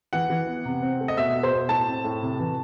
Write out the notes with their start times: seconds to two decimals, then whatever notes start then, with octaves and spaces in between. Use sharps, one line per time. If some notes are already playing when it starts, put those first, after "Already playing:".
0.13 E3 F#5
0.30 E3
0.47 B3
0.65 C3
0.83 C4
1.01 A3
1.08 D#5
1.17 B2 E5
1.35 B2
1.43 C5
1.52 B2
1.69 A2 A5
1.88 C4
2.05 A2
2.22 C3
2.39 E3